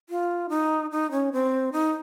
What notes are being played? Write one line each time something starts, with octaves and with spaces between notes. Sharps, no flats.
F4
D#4
D#4
C#4
C4
D#4